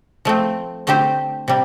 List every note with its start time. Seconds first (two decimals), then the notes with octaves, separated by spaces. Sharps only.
0.25 F3 A3 C4
0.87 D3 A3 C4 G4 C5
1.48 C3 G3